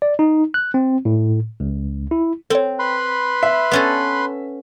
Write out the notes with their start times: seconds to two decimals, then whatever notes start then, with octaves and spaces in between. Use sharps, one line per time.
0.02 D5
0.19 D#4
0.54 F#6
0.74 C4
1.05 A2
1.60 C#2
2.11 E4
2.50 C4 A4 C#5
2.79 B4 B5 C6
3.43 E5 B6
3.71 B3 C#4 A4